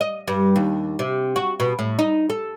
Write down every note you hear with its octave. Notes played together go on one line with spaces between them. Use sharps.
D#5
G2
D#2
C3
F#4
B2
A2
D#4
A4